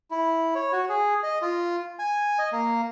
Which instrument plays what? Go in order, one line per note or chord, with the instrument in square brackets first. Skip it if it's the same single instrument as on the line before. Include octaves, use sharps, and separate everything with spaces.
[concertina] E4
C#5
F#4
G#4
D#5
F4
G#5
D#5
A#3